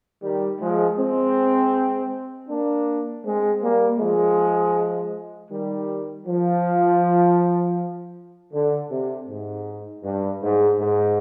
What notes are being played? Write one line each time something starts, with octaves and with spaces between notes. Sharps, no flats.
D#3 G3
F3 G#3
G#3 C4
A#3 D4
G#3 C4
G3 A#3
F3 G#3
D#3 G3
F3
D3
C3
G#2
G2
G#2
G#2